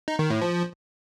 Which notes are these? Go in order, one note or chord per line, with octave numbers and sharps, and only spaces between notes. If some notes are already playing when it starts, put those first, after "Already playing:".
D#4
D#3
A2
F3